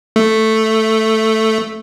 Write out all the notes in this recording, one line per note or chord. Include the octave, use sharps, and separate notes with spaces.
A3